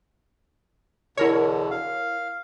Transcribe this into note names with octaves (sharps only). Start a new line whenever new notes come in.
E2 B2 D3 E4 A#4 C#5
F5